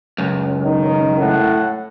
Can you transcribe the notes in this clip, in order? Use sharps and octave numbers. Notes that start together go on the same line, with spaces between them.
C#2 F#2
D#3
A2 F#5